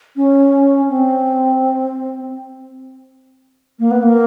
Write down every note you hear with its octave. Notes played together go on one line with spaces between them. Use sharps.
C#4
C4
A#3
B3
A#3